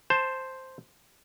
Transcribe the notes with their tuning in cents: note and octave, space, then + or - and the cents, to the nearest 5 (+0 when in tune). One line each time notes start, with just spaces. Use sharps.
C5 +0 A5 +0